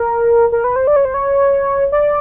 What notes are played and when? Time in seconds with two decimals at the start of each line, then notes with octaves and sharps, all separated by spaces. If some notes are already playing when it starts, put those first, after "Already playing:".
Already playing: A#4
0.52 A#4
0.64 B4
0.76 C5
0.87 D5
0.96 C#5
1.05 C5
1.14 C#5
1.92 D5